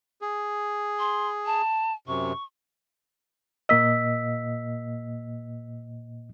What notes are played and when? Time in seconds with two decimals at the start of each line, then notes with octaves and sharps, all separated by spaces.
0.22 G#4
0.99 C6
1.46 A5
2.08 F#2 C3 C#6
3.69 A#2 A#3 D#5 E6 B6